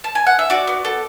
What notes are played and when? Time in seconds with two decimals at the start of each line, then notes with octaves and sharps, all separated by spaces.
0.04 A5
0.15 G#5
0.27 F#5
0.39 E5
0.50 F#4 D5
0.67 B3
0.85 A4